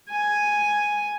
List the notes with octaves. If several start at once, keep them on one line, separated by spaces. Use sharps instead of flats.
G#5